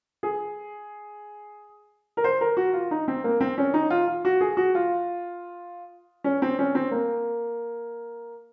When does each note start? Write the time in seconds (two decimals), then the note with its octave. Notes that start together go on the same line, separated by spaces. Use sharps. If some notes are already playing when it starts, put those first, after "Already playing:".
0.23 G#4
2.17 A#4
2.24 C5
2.41 A#4
2.57 F#4
2.73 F4
2.91 D#4
3.08 C4
3.24 A#3
3.41 C4
3.58 C#4
3.74 D#4
3.90 F4
4.08 F4
4.25 F#4
4.41 G#4
4.57 F#4
4.75 F4
6.24 C#4
6.42 C4
6.59 C#4
6.75 C4
6.91 A#3